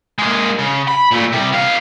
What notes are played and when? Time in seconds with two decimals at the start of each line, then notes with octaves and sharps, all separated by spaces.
0.19 G#3 A#3
0.59 C#3
0.88 B5
1.11 A#2 A3
1.32 C3 G3
1.53 B3 F5